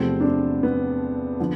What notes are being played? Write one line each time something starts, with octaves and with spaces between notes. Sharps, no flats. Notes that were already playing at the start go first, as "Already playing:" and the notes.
Already playing: E2 C3 F3 A3 C4
D4
C4
B3
D3 F3